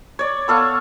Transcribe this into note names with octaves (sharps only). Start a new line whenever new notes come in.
C#5 D5
B3 A4 F5 C#6